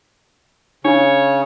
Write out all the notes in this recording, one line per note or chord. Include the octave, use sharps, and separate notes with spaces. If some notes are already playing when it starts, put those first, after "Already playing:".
C#3 D4 C#5